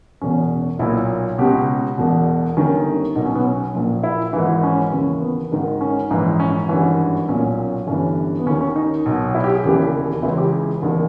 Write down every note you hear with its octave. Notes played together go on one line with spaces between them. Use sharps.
E1 E2 B2 C#4
B1 A#2 E4
C#2 B2 G4
E1 E2 B2
G1 G2 D#3 C#4
B1 B2 D#4
C#4
B3
C#4
A#1 A#2
E4
G#1 G#2 E3
C#4
D#2 C#3 E3
B3
G#1 G#2 D#3
C#4
A#1 G#2 E3
C#4
G#1 G2 E3 C#4
B1 A#2 C#4
G1 G2 E3 C#4
B3
D#2 D#3 C#4
C#4
D#4
B1 B2
E4
G4
G#4
E1 D#2 C#3 E3 G4
C#2 C#3 E3 E4
G4
G#4
E1 D#2 D#3